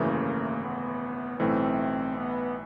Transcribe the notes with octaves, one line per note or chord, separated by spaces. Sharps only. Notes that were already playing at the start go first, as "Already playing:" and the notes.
Already playing: G#1 F#2 C#3 E3 A3 A#3
B3
B1 A2 E3 A3 C4
B3